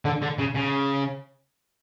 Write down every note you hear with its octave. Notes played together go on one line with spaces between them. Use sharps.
D3
D3
C#3
C#3